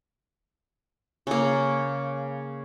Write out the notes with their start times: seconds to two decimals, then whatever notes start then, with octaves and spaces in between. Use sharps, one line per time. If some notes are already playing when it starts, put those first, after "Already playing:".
1.27 C#3 A#3